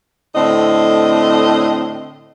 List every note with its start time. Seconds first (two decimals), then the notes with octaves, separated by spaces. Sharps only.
0.35 A2 D3 C4 D#5